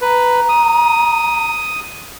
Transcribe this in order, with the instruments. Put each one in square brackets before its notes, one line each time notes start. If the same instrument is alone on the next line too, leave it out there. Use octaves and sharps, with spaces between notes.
[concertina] B4 [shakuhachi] A#5
[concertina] D#6